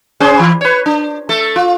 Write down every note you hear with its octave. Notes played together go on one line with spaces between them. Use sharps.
C#4 G#4 C5
E3
B4 C#5
D4
A3 A4
F4